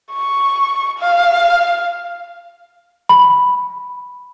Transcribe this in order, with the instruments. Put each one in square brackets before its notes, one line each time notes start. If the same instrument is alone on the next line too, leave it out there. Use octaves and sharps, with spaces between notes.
[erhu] C#6
F5
[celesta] B5